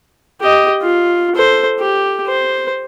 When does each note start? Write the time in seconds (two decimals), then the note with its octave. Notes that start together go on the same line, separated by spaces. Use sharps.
0.41 G4 D#5
0.82 F4
1.35 A4 C5
1.79 G4
2.27 C5